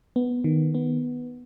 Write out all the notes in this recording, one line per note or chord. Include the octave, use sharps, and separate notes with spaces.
B3
D#3
B3